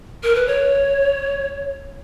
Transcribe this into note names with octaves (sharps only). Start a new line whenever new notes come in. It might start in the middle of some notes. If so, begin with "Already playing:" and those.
A#4
B4
C#5